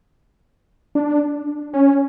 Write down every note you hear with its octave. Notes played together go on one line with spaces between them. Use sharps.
D4
C#4